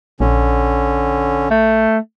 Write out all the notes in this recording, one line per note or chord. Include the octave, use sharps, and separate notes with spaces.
A#1 D3 C#4
A3